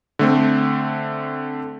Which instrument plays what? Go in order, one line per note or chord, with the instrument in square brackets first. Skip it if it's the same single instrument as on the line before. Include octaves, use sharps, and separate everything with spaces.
[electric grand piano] D3 A3 C4